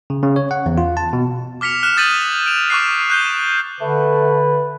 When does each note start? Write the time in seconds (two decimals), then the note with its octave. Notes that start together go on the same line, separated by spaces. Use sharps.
0.10 C#3
0.23 C#3
0.36 C#5
0.51 F#5
0.66 E2
0.78 F4
0.97 A5
1.13 B2
1.61 D6 F6 B6 C#7 F7
1.83 F6 F#6 E7
1.97 D#6 G6 A6 B6 D#7 F#7
2.46 D7 F7
2.70 C#6 D6 F#6 C7
3.10 F#6 G6 G7
3.81 D3 A3 B4